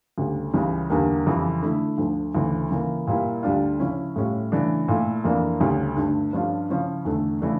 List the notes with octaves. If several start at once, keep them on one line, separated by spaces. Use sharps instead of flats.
D2 C#3 G3
C#2 C#3 E3 G3
E2 D3 G3 A#3
F2 C#3 E3 G3
D3 A3 E4
D2 D3 F3
D2 C#3 E3
C#3 E3 A#3
A#2 G3 A#3 E4
D2 D3 G3 D4 F4
C#3 F3 C#4 E4
A2 G3 C#4 F4
C#3 E3 A3 D4
A#2 A3 E4
F2 E3 A#3 D4
D2 C#3 G3 C#4
G2 D3 A3
G2 F3 C#4 F4
C#3 F3 C#4 E4
E2 D3 A3
C#3 E3 A3 D4